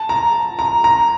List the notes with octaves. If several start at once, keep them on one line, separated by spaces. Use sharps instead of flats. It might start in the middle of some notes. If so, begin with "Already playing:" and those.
Already playing: A5
A#5
A#5
A#5